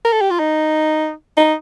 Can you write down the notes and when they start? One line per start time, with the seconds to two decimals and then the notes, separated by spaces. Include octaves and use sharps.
0.05 A#4
0.12 A4
0.21 G4
0.31 F4
0.39 D#4
1.37 D#4